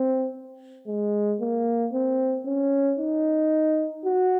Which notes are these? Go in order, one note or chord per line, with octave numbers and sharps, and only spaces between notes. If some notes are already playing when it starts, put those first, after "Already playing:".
Already playing: C4
G#3
A#3
C4
C#4
D#4
F#4